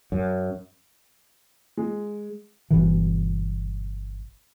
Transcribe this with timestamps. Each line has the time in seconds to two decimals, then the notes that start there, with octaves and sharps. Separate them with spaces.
0.12 F#2
1.77 G#3
2.70 G1 B2 E3